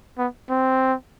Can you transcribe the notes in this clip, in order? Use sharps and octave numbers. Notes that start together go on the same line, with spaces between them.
B3
C4